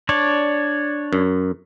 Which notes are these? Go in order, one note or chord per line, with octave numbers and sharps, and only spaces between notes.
D4 C#5 D5
F#2